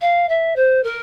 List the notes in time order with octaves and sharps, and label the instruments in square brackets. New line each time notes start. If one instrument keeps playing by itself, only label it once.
[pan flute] F5
E5
C5
A#4